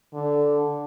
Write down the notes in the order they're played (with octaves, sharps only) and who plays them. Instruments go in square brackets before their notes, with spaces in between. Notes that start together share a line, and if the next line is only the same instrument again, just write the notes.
[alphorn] D3